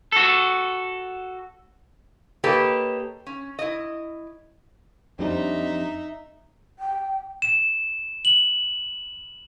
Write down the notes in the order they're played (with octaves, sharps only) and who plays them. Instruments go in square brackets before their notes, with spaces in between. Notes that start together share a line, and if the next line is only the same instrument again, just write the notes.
[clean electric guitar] F#4 A4
[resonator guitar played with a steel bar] A#3 G4 A4 B4 C#5 D#5
C#4
E4 D#5
[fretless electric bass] F2 [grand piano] G3 C4 D4 [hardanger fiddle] D#4 E5
[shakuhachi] G5
[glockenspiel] E7
F#7